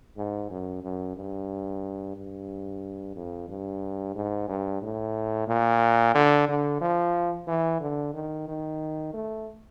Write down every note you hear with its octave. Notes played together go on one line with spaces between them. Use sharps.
G#2
F#2
F#2
G2
G2
F2
G2
G#2
G2
A2
A#2
D3
D3
F3
E3
D3
D#3
D#3
A3